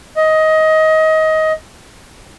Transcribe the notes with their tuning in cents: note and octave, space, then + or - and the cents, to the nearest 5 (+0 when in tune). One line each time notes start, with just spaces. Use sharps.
D#5 +20